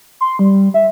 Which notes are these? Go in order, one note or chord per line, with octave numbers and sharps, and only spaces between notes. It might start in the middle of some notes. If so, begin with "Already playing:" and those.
C6
G3
E5